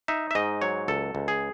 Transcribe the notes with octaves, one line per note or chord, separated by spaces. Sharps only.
D#4 E5
E5
G#2 D#5
F#3 C#5
C#2 A4
C#2
G#4